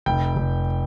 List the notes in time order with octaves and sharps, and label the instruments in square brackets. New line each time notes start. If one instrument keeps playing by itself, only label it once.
[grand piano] F1 G5
F1